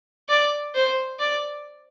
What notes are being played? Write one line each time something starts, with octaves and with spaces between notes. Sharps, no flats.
D5
C5
D5